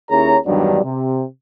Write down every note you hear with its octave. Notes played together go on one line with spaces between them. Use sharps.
D#2 C#4 E4 G#4 C#5 A#5
E2 G2 D#3 F#3 G3 D4
C3